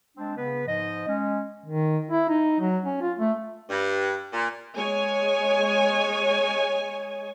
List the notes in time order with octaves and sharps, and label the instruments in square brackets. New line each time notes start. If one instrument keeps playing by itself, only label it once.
[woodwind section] G#3 C4 D4
C#3 B3 B4
G#2 F3 D#5
G#3 C#4
[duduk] D#3
E4
D#4
F#3
C#4
F4
A3
[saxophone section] G2
A#2
[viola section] G#3 C#5 G#5